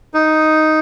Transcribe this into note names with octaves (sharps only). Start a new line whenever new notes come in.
D#4